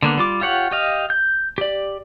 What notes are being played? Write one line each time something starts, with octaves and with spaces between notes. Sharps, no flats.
D3 A#3 B3
G3 F4 D6
F4 G4 C#5 F#5
G4 D#5 F5
G6
G4 D5